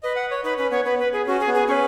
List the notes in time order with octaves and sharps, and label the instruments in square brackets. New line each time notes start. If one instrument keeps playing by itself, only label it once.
[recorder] B4 [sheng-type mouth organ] D#5
[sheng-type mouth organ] F#5
C#5
[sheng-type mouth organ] D#4 [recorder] B4
[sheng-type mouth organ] C#4 [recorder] B4
[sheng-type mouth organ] B3 [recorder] C#5
[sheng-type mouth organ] B3 [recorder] B4
[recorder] B4
G#4
[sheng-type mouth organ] C#4 [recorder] F#4
[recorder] G#4
[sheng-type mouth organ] B3
[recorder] G#4
[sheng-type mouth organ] C#4 [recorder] B4 C#5